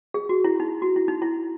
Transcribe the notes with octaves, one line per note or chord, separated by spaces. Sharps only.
G#4
F#4
E4
D#4
F#4
E4
D#4
E4